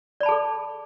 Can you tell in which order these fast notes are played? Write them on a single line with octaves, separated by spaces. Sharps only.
D5 B5 A5 G#4 A4